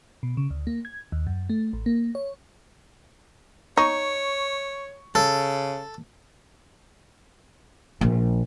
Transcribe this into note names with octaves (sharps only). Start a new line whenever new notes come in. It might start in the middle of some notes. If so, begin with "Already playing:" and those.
B2
C#3
D2
A#3
G#6
D#2
F#2
A3
A1
A#3
C#5
D#4 C#5 C#6
C#3 A4
A#1